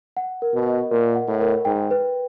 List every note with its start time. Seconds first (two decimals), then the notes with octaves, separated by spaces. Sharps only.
0.17 F#5
0.42 A#4
0.54 B2
0.66 D#5
0.91 A#2 A#4
1.15 F#5
1.28 A2
1.41 A#4
1.65 G#2 G5
1.91 B4